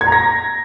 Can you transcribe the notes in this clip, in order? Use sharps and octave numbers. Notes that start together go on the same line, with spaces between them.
G#6
A#5
A#6